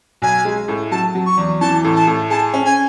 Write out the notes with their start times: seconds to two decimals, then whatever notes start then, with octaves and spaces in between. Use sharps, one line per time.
0.22 B1 G#5
0.45 G#3
0.68 A2
0.91 F#3 A5
1.15 F#3
1.26 C#6
1.37 E2
1.61 E3 A5
1.84 A2
1.96 A5
2.07 A2
2.30 G#4 A5
2.54 C#4
2.65 G#5